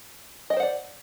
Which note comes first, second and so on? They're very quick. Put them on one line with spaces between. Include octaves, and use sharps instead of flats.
D#5 G5 C5 F#5 D5